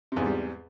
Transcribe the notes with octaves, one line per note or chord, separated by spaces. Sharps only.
E2 G#2 C3 G3